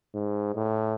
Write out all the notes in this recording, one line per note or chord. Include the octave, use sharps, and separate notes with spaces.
G#2
A2